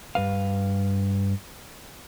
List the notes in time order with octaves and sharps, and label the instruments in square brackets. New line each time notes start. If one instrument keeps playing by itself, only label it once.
[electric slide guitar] G2 B4 F5